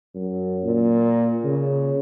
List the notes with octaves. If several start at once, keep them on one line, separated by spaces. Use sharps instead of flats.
F#2
A#2
C#3